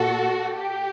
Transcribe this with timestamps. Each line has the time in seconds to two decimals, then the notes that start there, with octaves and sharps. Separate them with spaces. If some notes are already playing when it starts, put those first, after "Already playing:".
Already playing: A#2 F#4 A4
0.55 G4